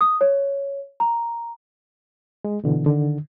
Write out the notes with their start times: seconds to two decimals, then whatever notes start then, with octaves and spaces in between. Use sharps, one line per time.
0.01 D#6
0.21 C#5
1.00 A#5
2.44 G#3
2.64 B2 D3 E3
2.86 D3 D#3